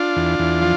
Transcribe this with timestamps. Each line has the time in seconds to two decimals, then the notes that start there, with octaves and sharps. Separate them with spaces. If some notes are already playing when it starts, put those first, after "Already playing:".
Already playing: D4 F4
0.16 E2
0.39 E2
0.62 F3